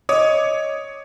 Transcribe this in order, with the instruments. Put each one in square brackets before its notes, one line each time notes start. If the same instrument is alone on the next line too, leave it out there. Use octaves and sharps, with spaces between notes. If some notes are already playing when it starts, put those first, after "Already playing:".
[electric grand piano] C#5 D6 D#6 [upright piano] D#5